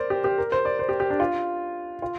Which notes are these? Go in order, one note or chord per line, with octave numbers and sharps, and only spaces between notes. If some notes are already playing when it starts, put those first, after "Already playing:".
Already playing: A#4 C5 D5
G4
G4
A#4
C5
D5
C5
G4
G4
D4
F4
F4